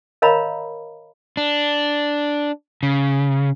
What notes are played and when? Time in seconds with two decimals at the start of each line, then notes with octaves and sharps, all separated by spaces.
0.22 A#4 C#5 D#5 F5 A#5 B5
1.37 D4
2.83 C#3